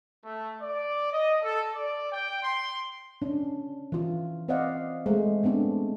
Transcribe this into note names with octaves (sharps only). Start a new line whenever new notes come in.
A3
D5
D#5
A4
D5
G5
C6
C#4 D4
E3 F4
C4 C5 D5 D#5 F5 F#5
G#3 A3 C5
A3 B3 C4 D4